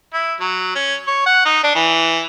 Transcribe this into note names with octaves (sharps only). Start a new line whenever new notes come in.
E4
F#3
C#4
C#5
F#5
D#4
D4
E3